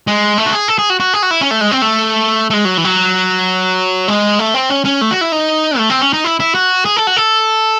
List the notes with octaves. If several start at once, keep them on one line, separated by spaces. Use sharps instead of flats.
G#3
A3
F#4
G#4
A4
G#4
F#4
F#4
G#4
F#4
E4
C#4
A3
G#3
C4
A3
A3
G#3
F#3
E3
F#3
G#3
A3
C4
C#4
C#4
A3
F#4
E4
D#4
A3
C4
C#4
D#4
E4
E4
F#4
G#4
A4
F#4
A4